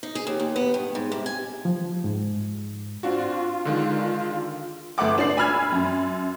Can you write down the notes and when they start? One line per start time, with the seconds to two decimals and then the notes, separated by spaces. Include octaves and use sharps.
0.03 D#4
0.15 G#4
0.27 D#2
0.40 D#2
0.56 B3
0.74 G2
0.95 G#2
1.12 C3
1.26 G#5
1.65 F3
2.04 G#2
3.03 C4 D4 F4 F#4
3.65 D3 D#3 G#3
4.98 G1 A3 F#5 D6
5.18 D4 C7
5.37 G#5 B5 E6 F6 G#6
5.72 F#2